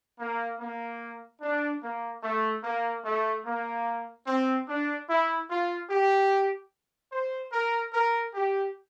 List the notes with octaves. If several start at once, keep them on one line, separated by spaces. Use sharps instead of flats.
A#3
A#3
D4
A#3
A3
A#3
A3
A#3
C4
D4
E4
F4
G4
C5
A#4
A#4
G4